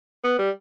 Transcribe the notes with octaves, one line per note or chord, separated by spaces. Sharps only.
B3
G3